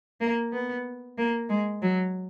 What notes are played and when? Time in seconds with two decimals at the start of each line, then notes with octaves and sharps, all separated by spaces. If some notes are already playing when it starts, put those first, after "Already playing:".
0.21 A#3
0.53 B3
1.18 A#3
1.50 G#3
1.82 F#3